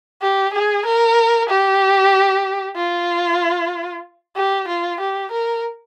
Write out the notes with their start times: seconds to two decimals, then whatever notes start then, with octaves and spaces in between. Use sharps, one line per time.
0.22 G4
0.54 G#4
0.86 A#4
1.49 G4
2.77 F4
4.36 G4
4.68 F4
5.00 G4
5.32 A#4